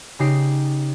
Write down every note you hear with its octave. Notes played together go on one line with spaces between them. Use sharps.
C#3 D#4 G4 C7